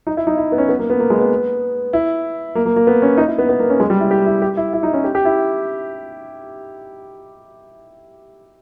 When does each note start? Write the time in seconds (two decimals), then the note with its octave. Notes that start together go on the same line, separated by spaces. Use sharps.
0.07 D#4
0.17 E4
0.27 D#4
0.38 E4
0.52 B3
0.58 C#4
0.69 B3
0.79 A#3
0.90 B3
1.00 A#3
1.10 G#3
1.21 B3
1.93 E4
2.55 A#3
2.66 A#3
2.76 A#3
2.87 B3
3.02 C#4
3.17 D#4
3.28 E4
3.38 B3
3.49 B3
3.59 A#3
3.70 C#4
3.80 G#3
3.90 G3
4.01 E4
4.11 G4
4.26 E4
4.42 G4
4.57 E4
4.73 E4
4.83 D#4
4.94 C#4
5.04 G4
5.15 G4
5.25 E4